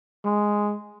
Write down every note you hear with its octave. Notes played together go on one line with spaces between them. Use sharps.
G#3